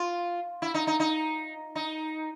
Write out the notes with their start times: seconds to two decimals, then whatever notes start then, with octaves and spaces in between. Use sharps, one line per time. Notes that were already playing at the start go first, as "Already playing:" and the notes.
Already playing: F4
0.62 E4
0.74 D#4
0.87 D#4
1.00 D#4
1.75 D#4